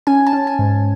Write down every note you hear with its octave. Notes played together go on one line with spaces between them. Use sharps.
C#4 G#5
A5
C#4
G#5
G#2